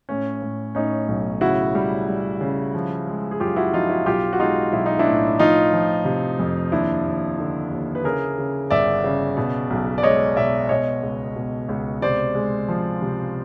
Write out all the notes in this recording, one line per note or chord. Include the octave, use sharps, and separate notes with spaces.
A2 C#4
A2
A2 C#4 D#4
B1
C#3 E4 F#4
G3
G3
C#3
F3
G#3
G#4
F#2 F4 G4
E4 F#4
F3 D#4 F4
E4 F#4
B1 F4 G4
F#4
G#3 D#4 F4
B1 E4
D#4
D4 E4
A2
F3 D#4 F4
F3
C3
F2
D#2 D4 E4
D#2
D3
D#2
B4
C#3 G#4 A#4
C#3
G1 D5 E5
C#3
B2
B1
D5
G#3 C#5 D#5
B2 D5 E5
B2 C#5 D#5
C#2
B2
C#2
C3 C5 D5
G#3
F3
C3